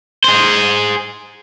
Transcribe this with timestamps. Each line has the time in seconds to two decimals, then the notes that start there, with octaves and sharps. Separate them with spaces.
0.24 G#4 C5